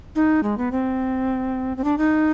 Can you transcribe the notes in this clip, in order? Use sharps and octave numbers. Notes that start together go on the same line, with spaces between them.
D#4
G#3
B3
C4
C4
D4
D#4